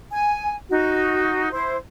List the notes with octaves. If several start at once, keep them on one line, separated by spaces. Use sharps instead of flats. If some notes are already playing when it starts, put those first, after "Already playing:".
G#5
D#4 F#4
E4 C5